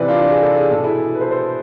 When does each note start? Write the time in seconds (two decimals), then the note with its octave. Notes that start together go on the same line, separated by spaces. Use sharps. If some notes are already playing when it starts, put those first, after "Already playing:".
Already playing: C3 E3 B4 D5
0.09 D4 F4
0.30 G#4
0.43 A4
0.57 G#4
0.70 B2 A4
0.84 E4 G#4
1.15 B4
1.21 A4 C5
1.31 A4 C5